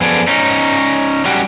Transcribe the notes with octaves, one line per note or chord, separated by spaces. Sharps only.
F#2 F3 B3 G#4 A4 D5
C#4 D#4
G3 C#4 F#4 G4